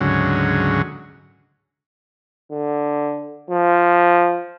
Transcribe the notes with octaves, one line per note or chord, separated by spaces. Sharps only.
D2 G#2 C#3 F#3
D3
F3